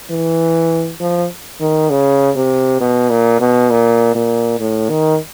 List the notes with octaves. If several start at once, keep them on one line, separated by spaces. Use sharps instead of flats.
E3
F3
D#3
C#3
C3
B2
A#2
B2
A#2
A#2
A2
D#3